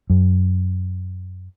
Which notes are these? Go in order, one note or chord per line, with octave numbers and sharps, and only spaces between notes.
F#2